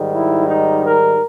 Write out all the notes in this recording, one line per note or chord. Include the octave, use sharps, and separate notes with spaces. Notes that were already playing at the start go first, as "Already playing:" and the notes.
Already playing: G#2 D#3 G3
E4
D#4
A#4